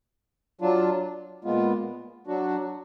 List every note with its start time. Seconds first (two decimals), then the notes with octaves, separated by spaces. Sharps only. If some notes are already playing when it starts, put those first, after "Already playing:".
0.61 F#3 D4 F4
1.44 A#2 G#3 B3 F4
2.27 F#3 D4 F#4